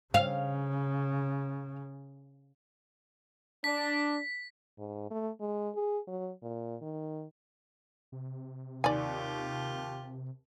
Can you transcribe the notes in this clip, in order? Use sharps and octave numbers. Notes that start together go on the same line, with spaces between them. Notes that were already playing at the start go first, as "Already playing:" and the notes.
C#3 F5
D4 B6
G#2
A3
G#3
G#4
F#3
A#2
D#3
C3
D#2 F4 G4 D5 G#5